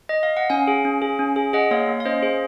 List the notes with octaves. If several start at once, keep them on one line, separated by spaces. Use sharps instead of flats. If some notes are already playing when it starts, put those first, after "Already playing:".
D#5
F5
F#5
C#4 F5 G#5
G#4
C#4
G#4
C#4
G#4
G#4 D#5 F#5
A#3 C#5 F5
A#3
F5
C#4 C5 D#5
G#4 C5